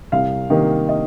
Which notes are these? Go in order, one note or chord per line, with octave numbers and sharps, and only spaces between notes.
C2 F5
C3 D#3 A#3 D#5
D#5